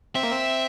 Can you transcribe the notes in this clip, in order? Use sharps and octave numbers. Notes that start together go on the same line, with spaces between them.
C4 E5
A#3
C4